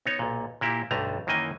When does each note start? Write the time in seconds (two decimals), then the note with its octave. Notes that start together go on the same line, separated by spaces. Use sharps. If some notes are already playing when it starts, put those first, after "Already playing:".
0.06 B3 D#4 C#5
0.19 B1 A#2
0.61 A#2 A#3 E4 G4
0.91 B1 G2 D3 A3 A#5
1.27 F#2 D#3 E3 A#3 D#5 G#5